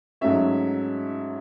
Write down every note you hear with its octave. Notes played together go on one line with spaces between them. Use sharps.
G#2 F#3 A3 C#4 E5